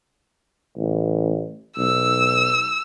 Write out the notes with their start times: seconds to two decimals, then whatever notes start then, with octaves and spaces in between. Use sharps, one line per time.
0.77 A1
1.77 B1 E6